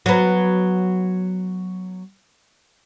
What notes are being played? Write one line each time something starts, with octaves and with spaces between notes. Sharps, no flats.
F#3 B3